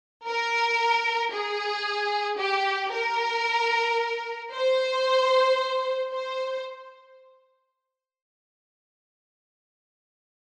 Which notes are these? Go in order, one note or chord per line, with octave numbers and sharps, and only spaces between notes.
A#4
G#4
G4
A#4
C5
C5